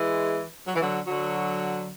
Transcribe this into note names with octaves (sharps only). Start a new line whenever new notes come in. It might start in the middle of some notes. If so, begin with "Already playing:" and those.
Already playing: E3 G#3
F#3
E3
D3 F#3
D3 F#3